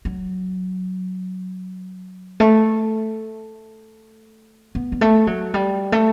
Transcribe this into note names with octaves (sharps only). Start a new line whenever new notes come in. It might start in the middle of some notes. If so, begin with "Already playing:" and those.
F#3
A3
B3
G3
A3
F#3
G3
A3